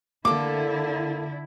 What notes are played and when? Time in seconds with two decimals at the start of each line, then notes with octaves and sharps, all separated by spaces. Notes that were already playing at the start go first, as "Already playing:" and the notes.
0.25 D3 A#3 E4 A4 D6